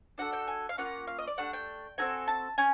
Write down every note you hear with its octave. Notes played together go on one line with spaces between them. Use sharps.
D4 F#4 A4 F#5
G5
G#5
F5
A#3 C#4 F4 F#5
F5
D#5
D5
A3 D4 G4 F#5
G5
C4 D#4 F#4 A4 G#5
A5
C#4 G#5